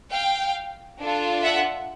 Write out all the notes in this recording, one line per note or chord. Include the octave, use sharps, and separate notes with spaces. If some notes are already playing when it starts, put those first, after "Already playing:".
F5 G5
D4 F4 A4
E5 F#5